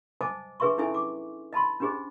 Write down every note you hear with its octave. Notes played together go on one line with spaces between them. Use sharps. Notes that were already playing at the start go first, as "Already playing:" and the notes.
C5 D#5 G#5 A5 D6 D#6
D4 G#4 B4 E5 C6 C#6
C#4 D#4 E4 A4 E5 G#5
D6
D#5 A5 B5 C6
C#4 D4 G4 G#4 C5 D#5